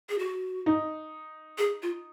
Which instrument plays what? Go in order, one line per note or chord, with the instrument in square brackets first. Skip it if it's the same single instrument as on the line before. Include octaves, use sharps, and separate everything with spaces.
[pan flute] G#4
F#4
[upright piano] D#4
[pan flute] G#4
F4